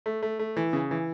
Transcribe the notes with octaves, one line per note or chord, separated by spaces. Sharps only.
A3
A3
A3
E3
C#3
E3